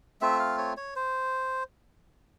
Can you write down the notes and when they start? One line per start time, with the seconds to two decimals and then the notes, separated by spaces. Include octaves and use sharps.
0.21 A3 C4 F4 E5
0.39 F5
0.58 C#5
0.77 C#5
0.96 C5